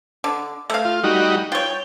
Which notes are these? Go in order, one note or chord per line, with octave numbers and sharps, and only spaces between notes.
D3
A3 F5
F4
G3 D#4 F#4
F4 C#5 G5